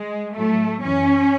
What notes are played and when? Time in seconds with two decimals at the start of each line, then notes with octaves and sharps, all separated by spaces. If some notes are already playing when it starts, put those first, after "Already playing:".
Already playing: G#3
0.35 A2 F#3 A3
0.82 F#2 E3 C#4